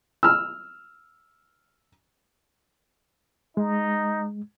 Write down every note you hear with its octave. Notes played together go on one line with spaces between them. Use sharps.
E6 F6
G#3 D#4